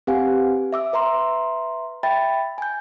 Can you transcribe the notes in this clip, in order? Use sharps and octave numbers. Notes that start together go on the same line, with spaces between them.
C4 G4 B4 F5 F#5 G#5
E5 D6 E6
B4 E5 A#5 C6
E5 G5 B5 A6
G#5 G6